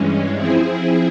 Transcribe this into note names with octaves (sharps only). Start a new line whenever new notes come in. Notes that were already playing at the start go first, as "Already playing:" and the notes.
Already playing: G2 E3 G#3 C#4
F3 C4 E4 G#4